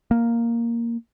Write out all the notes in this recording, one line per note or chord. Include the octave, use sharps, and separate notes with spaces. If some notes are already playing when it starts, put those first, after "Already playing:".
A#3